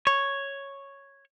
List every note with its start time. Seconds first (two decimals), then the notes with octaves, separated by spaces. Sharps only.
0.07 C#5